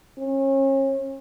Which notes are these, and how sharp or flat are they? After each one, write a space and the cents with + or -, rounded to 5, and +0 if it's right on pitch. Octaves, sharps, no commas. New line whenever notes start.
C#4 -35